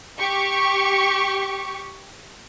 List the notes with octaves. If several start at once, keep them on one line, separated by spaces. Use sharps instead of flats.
G4 C#6